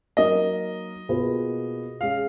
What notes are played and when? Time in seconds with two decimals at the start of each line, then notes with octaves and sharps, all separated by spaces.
0.17 F#3 A#3 D#4 A#4 D#5
1.09 B2 A#3 F4 G#4 B4
2.01 G#3 C#4 G#4 F5